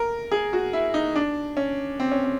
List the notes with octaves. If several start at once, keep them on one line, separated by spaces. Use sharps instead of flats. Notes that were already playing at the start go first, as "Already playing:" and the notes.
Already playing: A#4
G#4
F#4
E4
D#4
D4
C#4
C4
C#4
C4